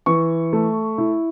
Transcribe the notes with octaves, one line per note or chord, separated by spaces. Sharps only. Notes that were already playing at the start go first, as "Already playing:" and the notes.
E3 C#6
A3
E4